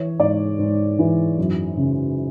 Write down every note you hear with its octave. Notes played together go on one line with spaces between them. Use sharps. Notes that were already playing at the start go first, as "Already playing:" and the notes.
Already playing: E3 C#5
G#2 D5
G#2
E3
F#2
C#3